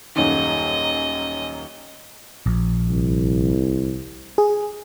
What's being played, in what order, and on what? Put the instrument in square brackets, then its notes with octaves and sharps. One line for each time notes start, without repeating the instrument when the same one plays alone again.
[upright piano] D#1 F#2 D#3 [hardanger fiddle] D#5
[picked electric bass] A#1
[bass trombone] C2
[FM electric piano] G#4